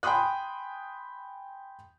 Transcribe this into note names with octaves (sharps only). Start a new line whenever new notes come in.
G5 G#5 B5 C6 D#6 F#6